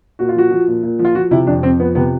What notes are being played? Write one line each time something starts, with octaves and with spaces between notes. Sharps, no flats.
A#2 F#4
F4
F3 F#4
F3
A#2
A#2
F3
F4
F3 F#4
C3 E4
F2 D4
F2 C4
F3 B3
C3 B3